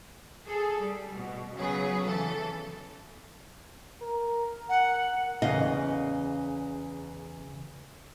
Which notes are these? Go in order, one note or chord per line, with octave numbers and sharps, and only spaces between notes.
G#4 A4
G3
B2
C#3 F#3 B3 G#4 B4
C#3 E3 A4
A#4
F#5
E2 C#3 D#5 F5